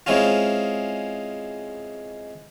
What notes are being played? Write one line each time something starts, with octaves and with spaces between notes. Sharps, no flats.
G#3 C4 C#4 E4 F4